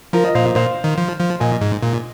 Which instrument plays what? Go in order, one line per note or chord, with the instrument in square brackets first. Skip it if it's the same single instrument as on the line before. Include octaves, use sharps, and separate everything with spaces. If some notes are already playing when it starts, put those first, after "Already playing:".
[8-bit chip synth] F3 [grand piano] F4 A#4
[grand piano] A#4 D#5
[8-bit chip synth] A#2 [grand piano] C5 F5
[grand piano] C5 F5
[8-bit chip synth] A#2 [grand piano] C5 F5
[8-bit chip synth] D#3
F3
F3
[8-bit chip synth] A#2 [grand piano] D#5 G#5
[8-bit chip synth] G#2
A#2